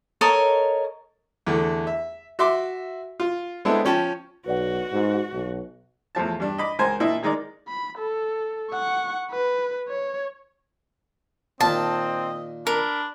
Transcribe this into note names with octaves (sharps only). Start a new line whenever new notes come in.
A4 A#4 C#5 D#5
E2 D3 A3
E5
F#4 E5 C6 D6
F4
G#3 B3 C4 D4 E4 A4
F3 C#4 G5 A5
B1 F#4 B4 D5 F#5
G#2
B1
E2 A2 F3 A5
G2 D4
D#5 B5 D6
C#2 A#4 C5 G#5
A#2 D4 E4 D#5
D#3 G#3 D#4 A#4 D5
B5
A4
F#5 C#6
B4
C#5
A#2 D#3 C4 D#5 A5
D4 A#4 B5